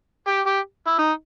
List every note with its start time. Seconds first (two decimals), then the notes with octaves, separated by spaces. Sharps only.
0.28 G4
0.46 G4
0.87 E4
0.99 D#4